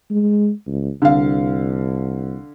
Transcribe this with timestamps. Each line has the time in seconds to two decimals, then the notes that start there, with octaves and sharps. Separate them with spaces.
0.11 G#3
0.67 C#2
1.02 C2 D3 F5